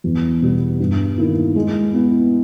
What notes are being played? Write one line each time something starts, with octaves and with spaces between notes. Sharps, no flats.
E2
B2 G3 B3
G2
D#3 A#3 E4
G#3
B3 E4